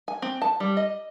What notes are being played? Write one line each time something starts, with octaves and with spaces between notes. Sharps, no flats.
G#5
C4
A5
G3
D#5